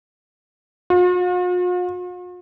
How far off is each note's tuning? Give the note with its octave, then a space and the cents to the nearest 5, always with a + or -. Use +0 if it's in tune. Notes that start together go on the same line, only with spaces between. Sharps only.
F4 +45